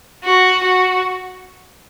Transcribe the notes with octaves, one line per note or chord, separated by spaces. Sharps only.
F#4
F#4